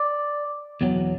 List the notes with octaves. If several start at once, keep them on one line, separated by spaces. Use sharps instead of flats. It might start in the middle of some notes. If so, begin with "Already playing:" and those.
Already playing: D5
E2 B2 F#3